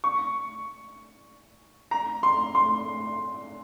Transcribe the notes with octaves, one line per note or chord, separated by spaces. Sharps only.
C#6
A#5
C6
C6